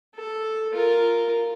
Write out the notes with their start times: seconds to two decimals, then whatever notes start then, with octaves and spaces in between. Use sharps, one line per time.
0.15 A4
0.73 F4 A#4